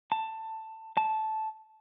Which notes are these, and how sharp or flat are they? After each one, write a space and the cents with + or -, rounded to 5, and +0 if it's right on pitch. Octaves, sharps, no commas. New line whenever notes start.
A5 +15
A5 -10